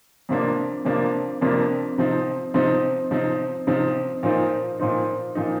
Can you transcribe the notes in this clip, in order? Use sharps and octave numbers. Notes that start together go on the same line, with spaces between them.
F2 C3 F3 A#3 D4
F2 C3 F3 A#3 D4
F2 C3 F3 A#3 D4
C3 F3 C4 D#4
C3 F3 C4 D#4
C3 F3 C4 D#4
C3 F3 C4 D#4
A#2 F3 C4 D#4
A#2 F3 C4 D#4
A#2 F3 C4 D#4